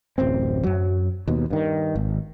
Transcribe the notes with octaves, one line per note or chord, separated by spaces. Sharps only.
D1 A1 F#2 C4
F#2 F#3
D#2 B2
G2 D#3
G#1